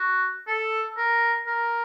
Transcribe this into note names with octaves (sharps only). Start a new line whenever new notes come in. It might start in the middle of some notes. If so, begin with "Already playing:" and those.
Already playing: F#4
A4
A#4
A#4